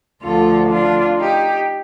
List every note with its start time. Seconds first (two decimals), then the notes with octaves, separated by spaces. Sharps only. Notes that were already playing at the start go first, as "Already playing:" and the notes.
0.23 D2 D3 F3 F4 A4
0.70 D4 F4
1.19 D#4 G4